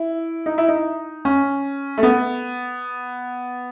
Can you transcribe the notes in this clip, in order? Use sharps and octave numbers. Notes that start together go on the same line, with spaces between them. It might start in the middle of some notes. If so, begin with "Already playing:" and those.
Already playing: E4
D#4
E4
D#4
C#4
A3
B3